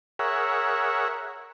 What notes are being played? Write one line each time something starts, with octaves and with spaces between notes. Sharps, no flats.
G#4 A#4 C#5 E5 F#5